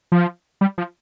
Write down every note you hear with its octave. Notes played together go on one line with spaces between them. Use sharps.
F3
G3
F3